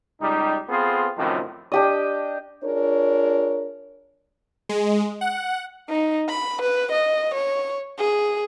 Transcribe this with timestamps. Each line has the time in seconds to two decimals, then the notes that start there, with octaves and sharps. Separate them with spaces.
0.20 C#2 G3 D#4
0.68 B3 C4 F4 G#4 A4 B4
1.17 F#2 A2 C3 D#3 F3 C4
1.72 D4 G4 D#5
2.64 D4 F4 G#4 A#4 C#5
4.69 G#3
5.21 F#5
5.90 D#4
6.29 B5
6.62 B4
6.92 D#5
7.34 C#5
7.98 G#4